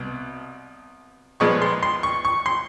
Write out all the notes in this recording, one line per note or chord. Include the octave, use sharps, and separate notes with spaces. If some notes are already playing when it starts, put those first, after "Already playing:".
Already playing: C2 B2
A#2 F3 G#3 B3 C#6
C6
C6
C#6
C#6
C6